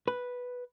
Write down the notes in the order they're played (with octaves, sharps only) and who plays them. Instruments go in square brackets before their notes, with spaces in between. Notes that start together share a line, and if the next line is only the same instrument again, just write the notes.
[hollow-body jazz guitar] B4